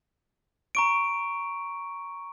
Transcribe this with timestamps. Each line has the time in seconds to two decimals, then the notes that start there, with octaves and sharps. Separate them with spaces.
0.75 A#5 C#6 D7